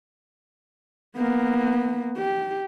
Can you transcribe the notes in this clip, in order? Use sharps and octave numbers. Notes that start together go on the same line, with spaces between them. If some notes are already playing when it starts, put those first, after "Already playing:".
A#3 B3
G4